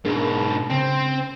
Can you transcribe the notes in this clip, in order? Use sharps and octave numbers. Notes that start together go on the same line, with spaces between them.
G#2 B2 D4 G#4 A#4
C#3 C4